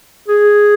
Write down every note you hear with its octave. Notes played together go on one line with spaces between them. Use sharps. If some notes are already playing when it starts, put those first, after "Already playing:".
G#4